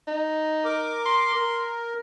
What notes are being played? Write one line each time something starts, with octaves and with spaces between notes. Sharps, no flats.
D#4
A#4 D6
C6
A#4